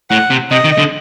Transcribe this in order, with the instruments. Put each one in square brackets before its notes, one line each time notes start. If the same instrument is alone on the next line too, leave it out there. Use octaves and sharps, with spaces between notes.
[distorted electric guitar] A2 [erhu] F#5
[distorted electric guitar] C3
[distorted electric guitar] C3 [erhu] D#5
[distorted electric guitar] D#3
D3